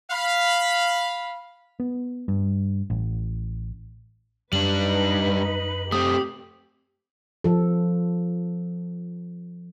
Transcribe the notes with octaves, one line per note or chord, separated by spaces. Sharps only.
F5 B5
B3
G2
A1
F#2 G3 D4 D#4 B4 F#7
A3 C4 G4 D#6
F3 A4